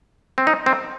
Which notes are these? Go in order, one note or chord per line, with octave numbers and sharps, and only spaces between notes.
C4
D#4
C4